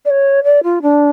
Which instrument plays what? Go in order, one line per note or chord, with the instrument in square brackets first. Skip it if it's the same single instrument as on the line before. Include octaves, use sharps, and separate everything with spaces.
[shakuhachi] D5
C#5
D5
F4
D4